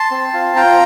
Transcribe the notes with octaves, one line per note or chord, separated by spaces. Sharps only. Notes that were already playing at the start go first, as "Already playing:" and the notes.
Already playing: A5 C6
C4
F4
F4 G5 A#5